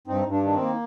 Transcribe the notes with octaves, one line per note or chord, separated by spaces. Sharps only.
G2 C4 D#4
G2
D4
D#3 D4
C4
A#3